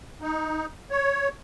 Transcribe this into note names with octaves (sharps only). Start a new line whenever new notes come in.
D#4
C#5